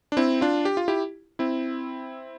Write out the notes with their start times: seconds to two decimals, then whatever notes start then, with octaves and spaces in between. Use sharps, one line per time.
0.12 D4
0.17 C4 E4
0.41 D4 F4
0.65 G4
0.77 F4
0.88 E4 G4
1.39 C4 E4